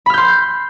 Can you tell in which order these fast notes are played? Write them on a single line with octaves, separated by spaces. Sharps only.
B5 F6 G6 C6